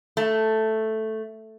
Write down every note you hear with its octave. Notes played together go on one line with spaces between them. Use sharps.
A3